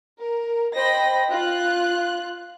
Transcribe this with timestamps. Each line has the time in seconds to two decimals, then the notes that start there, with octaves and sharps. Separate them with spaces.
0.20 A#4
0.75 C5 D#5 G5 B5 A#6
1.31 F4 F#6